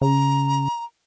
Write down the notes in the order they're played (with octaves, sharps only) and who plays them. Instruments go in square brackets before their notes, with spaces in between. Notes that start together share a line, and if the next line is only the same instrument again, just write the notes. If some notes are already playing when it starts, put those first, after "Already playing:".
[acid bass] C#3 [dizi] A#5